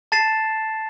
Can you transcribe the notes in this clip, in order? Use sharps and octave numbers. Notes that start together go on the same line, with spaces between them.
A5 A6 C7 E7